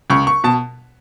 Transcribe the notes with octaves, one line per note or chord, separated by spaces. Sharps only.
C#2 C#6
C#6
B2 A5